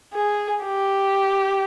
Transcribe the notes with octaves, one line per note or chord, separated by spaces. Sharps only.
G#4
G4